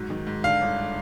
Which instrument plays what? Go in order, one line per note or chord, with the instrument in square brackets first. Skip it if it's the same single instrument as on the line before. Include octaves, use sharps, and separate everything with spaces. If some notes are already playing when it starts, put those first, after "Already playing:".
Already playing: [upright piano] G#2 F#3
D#3
G#2
[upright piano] D3 [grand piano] F5
[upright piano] G1